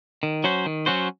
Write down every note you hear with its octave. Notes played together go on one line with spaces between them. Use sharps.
D#3
F#3 C#4 F#4 C5
D#3
F#3 C#4 F#4 C5